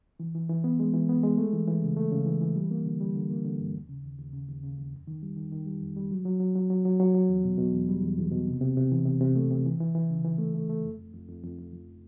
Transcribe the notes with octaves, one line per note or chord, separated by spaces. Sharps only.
E3
E3
E3
B3
G#3
E3
B3
G#3
A3
E3
E3
C#3
A3
C#3
E3
E3
G3
A#3
D3
G3
D3
A#3
D3
G2
D#2
C#3
D#2
D#2
C#3
D#2
C#3
D#2
F2
D#3
G3
D#3
D#3
G3
F2
G3
F#3
F#3
F#3
F#3
F#3
F#3
F#3
F#3
E2
B2
B2
E2
G3
E2
E2
B2
C3
C3
C3
E3
C3
C3
A3
C3
E3
E3
E3
C#3
E3
A3
A3
A3
F2
F2
F2
F2
F2
F2
F3